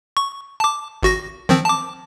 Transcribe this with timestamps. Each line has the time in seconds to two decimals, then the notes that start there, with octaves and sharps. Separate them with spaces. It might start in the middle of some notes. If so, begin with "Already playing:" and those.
0.17 C#6
0.60 A5 D6
1.03 G#1 F#4 A#6
1.49 D#3 F3 C4
1.65 A5 D6